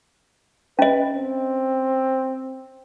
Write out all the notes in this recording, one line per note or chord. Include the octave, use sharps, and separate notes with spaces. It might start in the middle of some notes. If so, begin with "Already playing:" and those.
C#4 B4 D#5
C4